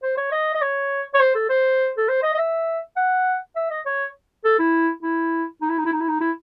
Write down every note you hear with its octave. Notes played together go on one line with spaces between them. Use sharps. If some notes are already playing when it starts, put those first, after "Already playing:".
C5
C#5
D#5
D#5
C#5
C#5
C5
A4
C5
A4
C5
D#5
D#5
E5
F#5
E5
D#5
C#5
A4
E4
E4
D#4
E4
D#4
E4
D#4
E4
D#4
E4